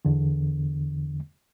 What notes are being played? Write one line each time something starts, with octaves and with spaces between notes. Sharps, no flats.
E2 D3